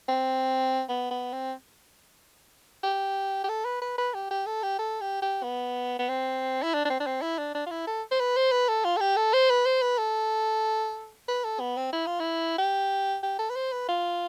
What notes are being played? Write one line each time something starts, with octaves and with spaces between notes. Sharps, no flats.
C4
B3
B3
C4
G4
G4
A4
B4
B4
B4
G4
G4
A4
G4
A4
G4
G4
B3
B3
C4
E4
D4
D4
C4
D4
C4
E4
D4
D4
F4
E4
A4
C5
B4
C5
B4
A4
F4
A4
G4
A4
C5
B4
C5
B4
A4
B4
A4
B3
C4
E4
F4
E4
G4
G4
A4
B4
C5
B4
F4